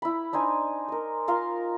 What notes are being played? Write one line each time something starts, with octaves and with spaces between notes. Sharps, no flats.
E4 B5
D4 D#4 C5 G#5
A#4 D#5
F4 A#4 F5 C6